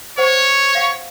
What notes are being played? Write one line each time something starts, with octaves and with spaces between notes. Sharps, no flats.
C5 C#5 F#5
F5 F#5